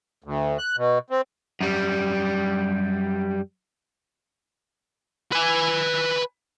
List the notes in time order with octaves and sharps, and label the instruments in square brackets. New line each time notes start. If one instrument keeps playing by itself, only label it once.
[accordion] D2
F#6
B2
C4
[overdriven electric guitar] F#2 G3
[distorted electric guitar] B4 G#5